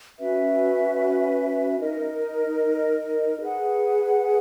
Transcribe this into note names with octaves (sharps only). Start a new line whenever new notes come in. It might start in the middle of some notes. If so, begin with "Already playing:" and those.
C#4 F#4 B4 E5
D#4 A#4 D#5
G#4 B4 F#5